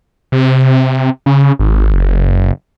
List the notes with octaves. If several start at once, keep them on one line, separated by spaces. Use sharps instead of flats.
C3
C#3
G#1
F#1